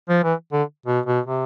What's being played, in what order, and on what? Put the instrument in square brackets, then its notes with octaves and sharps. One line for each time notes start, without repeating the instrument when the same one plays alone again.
[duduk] F3
E3
D3
B2
B2
C3